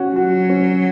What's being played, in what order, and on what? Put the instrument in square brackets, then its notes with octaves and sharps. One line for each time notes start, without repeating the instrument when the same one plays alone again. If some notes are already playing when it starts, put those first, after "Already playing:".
Already playing: [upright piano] C#4 F#4
[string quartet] F#3 [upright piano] F#4
[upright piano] C#4